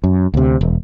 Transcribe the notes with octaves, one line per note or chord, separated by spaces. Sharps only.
F#2
D2 C3
E1